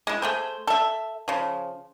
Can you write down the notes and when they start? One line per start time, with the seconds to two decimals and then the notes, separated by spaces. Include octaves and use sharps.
0.07 G#3 E4
0.22 A3 G#4 C5
0.67 A4 E5
1.28 C#3 F3